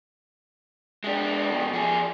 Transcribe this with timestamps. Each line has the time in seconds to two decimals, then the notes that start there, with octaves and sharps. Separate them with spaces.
1.04 G#3 D4
1.50 D#2 B2
1.73 F3 G#4